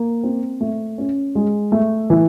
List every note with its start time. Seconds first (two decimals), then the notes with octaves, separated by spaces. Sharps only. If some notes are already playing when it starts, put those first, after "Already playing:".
Already playing: A#3
0.23 C4
0.61 A3
0.98 C#4
1.35 G#3
1.72 A3
2.10 E3